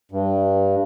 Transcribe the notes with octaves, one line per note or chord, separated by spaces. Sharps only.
G2